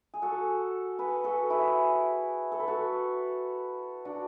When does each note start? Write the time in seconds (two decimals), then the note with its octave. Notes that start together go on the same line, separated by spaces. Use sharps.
0.14 G#4
0.22 F#4 A4
0.98 G#4 B4
1.24 F#4 A4
1.50 E4 G#4
2.52 A4
2.60 B4
2.68 F#4 A4
4.05 D4 F#4